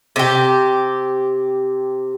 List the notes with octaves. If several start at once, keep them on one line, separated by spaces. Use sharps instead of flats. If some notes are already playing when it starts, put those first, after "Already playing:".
C3 G4